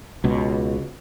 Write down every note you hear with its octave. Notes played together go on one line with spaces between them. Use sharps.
C#2 B2